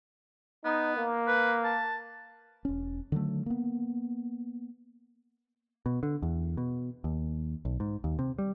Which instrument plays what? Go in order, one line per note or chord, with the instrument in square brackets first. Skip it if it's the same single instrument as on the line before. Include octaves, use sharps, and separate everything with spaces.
[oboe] B3 [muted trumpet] D#4
[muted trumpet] A#3
[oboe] B4
A5
[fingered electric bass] E1 C#4
D3 D#3 F#3 A3
A#3 B3
[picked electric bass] B2
D3
E2
B2
D#2
B1
G#2
D#2
C3
G3